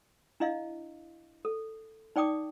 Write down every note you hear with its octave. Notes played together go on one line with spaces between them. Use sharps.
D4 E4 D#5 F5
A4
D#4 D5 G5 D6 D#6